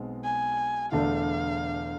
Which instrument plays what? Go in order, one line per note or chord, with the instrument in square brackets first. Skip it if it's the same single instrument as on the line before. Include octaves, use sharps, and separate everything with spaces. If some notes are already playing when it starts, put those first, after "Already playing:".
Already playing: [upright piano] B1 B2 G#3 C4
[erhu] G#5
[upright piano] E1 E2 D3 A3 D4 [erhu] F5